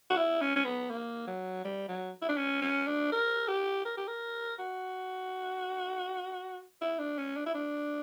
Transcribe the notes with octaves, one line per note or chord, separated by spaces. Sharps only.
F#4
E4
C#4
C#4
B3
A#3
F#3
G3
F#3
E4
D4
C#4
C#4
D4
A#4
G4
A#4
G4
A#4
F#4
E4
D4
C#4
D4
E4
D4